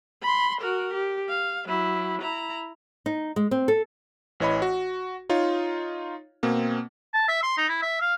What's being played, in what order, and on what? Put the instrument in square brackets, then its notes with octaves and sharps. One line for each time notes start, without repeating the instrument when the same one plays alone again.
[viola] B5 C6
F#4 A#4
G4
F5
F#3 E4
E4 A#5
[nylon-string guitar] D#4
G#3
C4
A4
[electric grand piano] A1 E3 C#5 D#5 B5
F#4
D#4 F4 C#5
B2 A#3 C4
[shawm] A5
E5
C6
D#4
E4
E5
F5